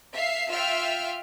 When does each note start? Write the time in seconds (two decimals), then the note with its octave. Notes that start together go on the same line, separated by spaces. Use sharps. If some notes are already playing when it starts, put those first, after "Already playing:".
0.15 E5 F5 C7
0.49 F4 E5 F5 G5 E6 F6